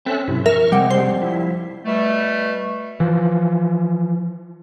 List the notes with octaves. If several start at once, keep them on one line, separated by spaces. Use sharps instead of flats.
C4 C#4 A4 E5 F#6
B1 G2 C3 E4
F2 A#4 E5 C#6 F6
C#2 C3 G3 G#3 C4 F#5 C#7
F2 G3 C5
F3 E4
B2 G3 A3
E3 F3